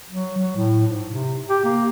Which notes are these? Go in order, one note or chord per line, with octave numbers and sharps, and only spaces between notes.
F#3
F#3
A2
G#2
C3
G4
A#3